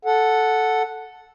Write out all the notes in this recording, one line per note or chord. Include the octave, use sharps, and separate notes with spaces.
A4 F#5